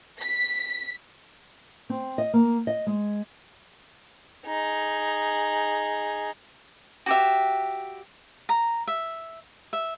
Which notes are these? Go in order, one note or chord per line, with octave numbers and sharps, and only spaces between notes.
B6
C4
D#5
A#3
D#5
G#3
D#4 G#4
F#4 G4 E5
A#5
E5
E5